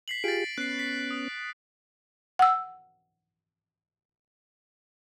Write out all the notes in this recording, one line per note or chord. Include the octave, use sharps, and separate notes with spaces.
B6 C7 F#7
F4 G4 G#4 A6 D7
B3 C#4 F#6 C7
B6
D#6
F#5 E6